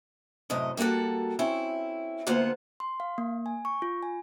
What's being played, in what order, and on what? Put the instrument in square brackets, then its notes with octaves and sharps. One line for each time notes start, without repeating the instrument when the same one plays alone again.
[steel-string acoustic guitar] F#2 A2 C3 D#5
G3 A#3 F#4 A4 F#5
C4 C#4 E4
D2 A#3 B3 F4 C5 F#5
[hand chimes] C6
F5
A#3
G#5
C#6
F4
G#5